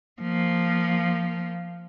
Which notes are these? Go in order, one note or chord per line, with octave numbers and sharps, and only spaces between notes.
F3 A#3